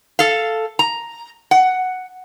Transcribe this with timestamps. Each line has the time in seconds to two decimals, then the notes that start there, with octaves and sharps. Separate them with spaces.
0.19 A4 F5
0.79 A#5
1.51 F#5